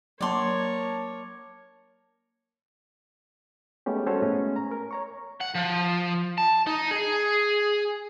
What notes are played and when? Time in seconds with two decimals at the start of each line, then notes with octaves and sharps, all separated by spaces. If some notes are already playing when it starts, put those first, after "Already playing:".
0.21 F#3 A#3 A#4 C#5 D5 A5 C6
3.86 G#3 A3 B3 C#4 G4
4.07 G3 C#4 F#4 A4 C5 C#5
4.22 A2 G#3 A3 B3 C#4
4.56 A#5
4.71 A#4
4.91 C#5 A#5 C#6
5.40 F#5
5.55 F3
6.38 A5
6.67 D#4
6.91 G#4